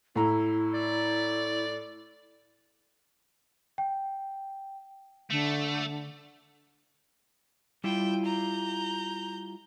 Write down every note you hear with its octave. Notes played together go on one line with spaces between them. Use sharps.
A2 E4 A#5
D5
G5
D3 A3
G3 E4 F4 G5
A#5 G6